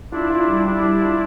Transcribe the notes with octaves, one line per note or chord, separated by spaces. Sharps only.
D4 E4 F4
F4
G3
G3 D4 E4
G3
F4